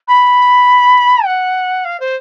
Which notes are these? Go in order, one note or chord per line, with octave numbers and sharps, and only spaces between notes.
B5
F#5
F5
C5